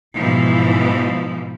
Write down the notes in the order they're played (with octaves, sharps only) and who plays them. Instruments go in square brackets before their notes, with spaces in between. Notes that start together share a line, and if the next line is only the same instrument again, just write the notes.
[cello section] G#2 B2 E3 F3